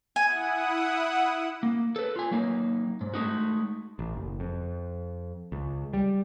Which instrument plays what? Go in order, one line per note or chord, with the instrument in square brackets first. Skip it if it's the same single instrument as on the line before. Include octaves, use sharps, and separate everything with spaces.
[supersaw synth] E4 F#5 D#6 [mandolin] G#5
[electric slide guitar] A#3
A4 B4
F4 G#5
F#3 A#3 D#4
G#2
G#3 A3 D#4 F#4
[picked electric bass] A1
F#1
F2
C#2
G3